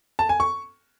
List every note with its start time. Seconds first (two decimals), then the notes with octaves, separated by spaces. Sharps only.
0.19 A5
0.29 G#5
0.40 C#6